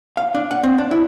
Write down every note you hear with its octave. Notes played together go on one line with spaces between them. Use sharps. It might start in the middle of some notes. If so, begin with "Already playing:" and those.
F5
D4
F#5
C4
D4
E4